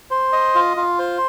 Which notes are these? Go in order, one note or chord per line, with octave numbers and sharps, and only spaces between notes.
C5
D#5
F4
F4
C5